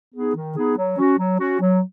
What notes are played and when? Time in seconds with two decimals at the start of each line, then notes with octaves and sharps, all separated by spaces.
0.14 B3 D#4 G#4
0.35 D#3
0.57 B3 D#4 G#4
0.77 F#3
0.98 C#4 F#4
1.18 F#3
1.39 C#4 F#4
1.61 F#3